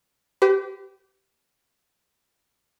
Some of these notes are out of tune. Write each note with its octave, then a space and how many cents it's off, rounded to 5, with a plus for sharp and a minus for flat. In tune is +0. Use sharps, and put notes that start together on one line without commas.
G4 -20 B4 +45